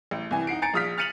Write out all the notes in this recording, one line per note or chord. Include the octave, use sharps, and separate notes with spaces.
A1
C2 E3 G#5
D#4 F#5 C7 D7
G#5 A#5 A6 C#7 D7
A#1 F4 D#6 F6 B6
F6 A6 C#7 D#7 F7 F#7